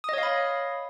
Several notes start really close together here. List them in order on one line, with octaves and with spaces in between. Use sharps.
D#6 D#5 C#5 F5 B5